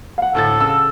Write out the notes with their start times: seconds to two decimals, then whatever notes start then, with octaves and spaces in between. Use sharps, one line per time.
0.18 F5 F#5
0.35 D2 A2 A4 A6
0.60 C#3 E6